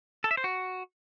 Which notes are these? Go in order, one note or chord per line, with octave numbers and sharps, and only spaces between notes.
A4
E5
C5
F#4